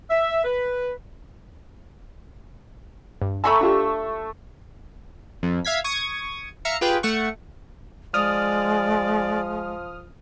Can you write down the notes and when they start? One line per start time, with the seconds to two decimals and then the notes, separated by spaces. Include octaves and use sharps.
0.10 E5
0.44 B4
3.22 G2
3.44 A3 G#5 A#5 B5 C#6 E6
3.61 D4 F4 G4
5.43 F2
5.65 E5 F5 G#6 B6
5.84 C#6 D#6 G#6
6.65 E5 F5 A#5 C#7
6.81 F4 G4 G#4 B4 G5
7.03 A3 F#5 C#6
8.14 F3 G#3 D5 D#6 F6